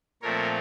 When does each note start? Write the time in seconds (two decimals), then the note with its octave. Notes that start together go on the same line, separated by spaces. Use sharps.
0.22 A#2 F3 A3 C4 A#4 C#5